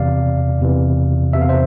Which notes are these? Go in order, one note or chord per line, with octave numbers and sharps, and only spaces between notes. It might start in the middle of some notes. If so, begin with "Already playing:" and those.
Already playing: E2 C3 E3 D5 F5
E2 C3 E3
E2 C3 E3 E5
F5
C5 E5